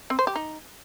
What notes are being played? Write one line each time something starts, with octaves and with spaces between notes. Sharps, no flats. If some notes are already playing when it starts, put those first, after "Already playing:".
C4
C5
G4
D#4